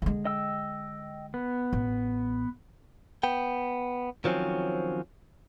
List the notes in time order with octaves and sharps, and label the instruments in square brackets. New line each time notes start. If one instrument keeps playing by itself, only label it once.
[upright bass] D3 G#3
[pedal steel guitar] D#5 G5 E6
B3
[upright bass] A1
[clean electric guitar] B3 G5
D#3 F3 F#3 C4 C#4